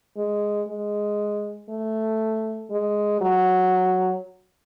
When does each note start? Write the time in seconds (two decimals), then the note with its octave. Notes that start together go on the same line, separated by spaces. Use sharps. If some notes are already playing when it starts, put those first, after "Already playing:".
0.17 G#3
0.68 G#3
1.69 A3
2.71 G#3
3.21 F#3